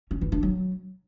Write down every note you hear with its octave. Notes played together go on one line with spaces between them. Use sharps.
C#4
E3
D4
F#3